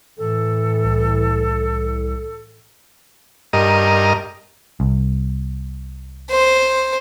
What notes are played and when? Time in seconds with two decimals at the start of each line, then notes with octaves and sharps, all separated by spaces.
0.18 A2 E3 A4
0.84 C2
3.53 G2 A#4 D#5
4.80 C2
6.31 C5